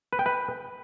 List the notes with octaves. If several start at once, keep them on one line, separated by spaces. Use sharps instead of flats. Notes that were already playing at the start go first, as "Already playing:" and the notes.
B4
G5
B4